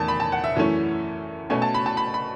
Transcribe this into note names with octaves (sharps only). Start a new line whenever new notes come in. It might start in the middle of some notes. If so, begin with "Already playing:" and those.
Already playing: E2 D#3 A3 A5
B5
A5
F#5
E5
F#2 E3 A3 C#4
B2 A3 C#4 G#5
A5
B5
A5
B5
B5